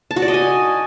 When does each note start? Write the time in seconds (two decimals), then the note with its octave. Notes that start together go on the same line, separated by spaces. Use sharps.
0.11 A5
0.16 F#4
0.22 D5
0.28 D#5
0.34 G#5